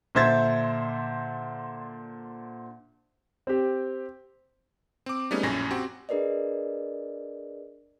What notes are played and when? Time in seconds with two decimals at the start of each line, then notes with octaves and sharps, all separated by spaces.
0.15 A#2 D3 C5 E5 G#6 A6
3.47 C4 G4
5.06 C4 D6
5.31 G3 A3 B3 C#4 D#4 G#4
5.43 A#1 F#2 A2 C#4 G#5 A#6
5.70 C4 F#4 G4 C6
6.09 D4 G#4 A#4 B4 D5 D#5